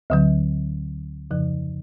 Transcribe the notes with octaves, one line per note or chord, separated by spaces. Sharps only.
D2 D3 F#3
F2 C#3 F3